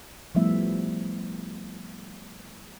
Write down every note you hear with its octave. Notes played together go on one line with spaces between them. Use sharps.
F3 G3 A3 B3 E4 E5